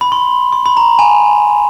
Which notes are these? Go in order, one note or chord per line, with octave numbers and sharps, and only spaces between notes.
B5
C6
C6
B5
A#5
G#5